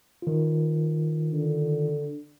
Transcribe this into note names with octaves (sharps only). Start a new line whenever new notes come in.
D#3 F4
D3